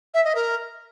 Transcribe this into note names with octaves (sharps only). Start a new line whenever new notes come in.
E5
D#5
A#4